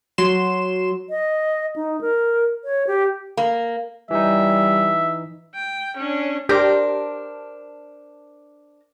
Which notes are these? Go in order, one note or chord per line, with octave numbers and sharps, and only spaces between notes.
F#3 C6 E7
D#5
D#4
A#4
C#5
G4
A#3
E3 G3 D#4 E5
G5
C#4 D4
D4 G4 A#4 C5